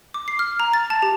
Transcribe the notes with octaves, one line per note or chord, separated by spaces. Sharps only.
D6
C7
F6
A#5
A6
A5
G4